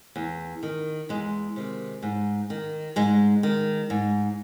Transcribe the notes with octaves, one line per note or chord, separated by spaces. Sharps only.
E2
D#3
E2 G#3
C3 D#3
G#2
D#3
G#2 G#3
D#3
G#2